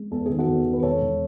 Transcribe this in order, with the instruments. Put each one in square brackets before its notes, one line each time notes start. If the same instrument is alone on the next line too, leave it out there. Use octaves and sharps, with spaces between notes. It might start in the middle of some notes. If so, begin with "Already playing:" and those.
Already playing: [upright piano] G#3
E2 A4
D#3 G#4
F#4 A4
E2
D#3
B4
E1 A4 C#5
E1